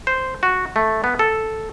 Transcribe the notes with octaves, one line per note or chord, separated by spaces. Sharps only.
C5
F#4
A3
B3
A4